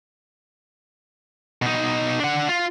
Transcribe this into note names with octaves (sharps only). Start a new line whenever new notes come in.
B2 D#4
D4 F#5
F4